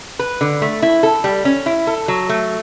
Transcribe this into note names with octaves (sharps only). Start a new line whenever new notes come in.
B4
D3
A3
E4
A4
G3
C#4
E4
A4
F#3
A3